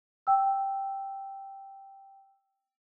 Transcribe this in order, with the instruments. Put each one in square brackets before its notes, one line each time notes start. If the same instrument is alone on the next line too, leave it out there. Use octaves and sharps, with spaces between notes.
[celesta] G5 E6